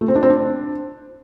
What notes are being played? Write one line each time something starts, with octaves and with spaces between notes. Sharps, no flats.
A3
C4
D4
C4
D4